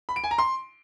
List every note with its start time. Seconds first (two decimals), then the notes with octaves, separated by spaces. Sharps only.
0.09 B5
0.16 D7
0.24 G#5
0.31 A#5
0.38 C6